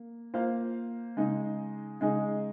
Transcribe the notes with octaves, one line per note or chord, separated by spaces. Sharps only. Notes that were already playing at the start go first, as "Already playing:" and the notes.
Already playing: A#3
A#3 F4 C5 F5
C#3 G#3 D#4 G#4 D#5
C#3 G#3 D#4 G#4 D#5